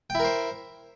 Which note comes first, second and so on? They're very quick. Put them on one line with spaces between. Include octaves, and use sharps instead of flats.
G5 E4 A#4 C5